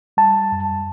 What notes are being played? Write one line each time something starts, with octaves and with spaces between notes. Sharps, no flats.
G3 A5
F#2